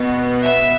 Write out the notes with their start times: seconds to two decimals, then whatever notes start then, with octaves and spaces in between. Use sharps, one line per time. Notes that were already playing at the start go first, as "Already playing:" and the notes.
Already playing: B2 B3
0.43 E5